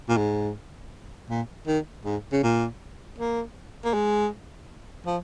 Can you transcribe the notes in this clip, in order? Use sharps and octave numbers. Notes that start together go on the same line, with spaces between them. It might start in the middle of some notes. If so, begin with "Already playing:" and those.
A#2
G#2
A#2
D#3
G#2
C#3
A#2
A#3
A#3
G#3
F3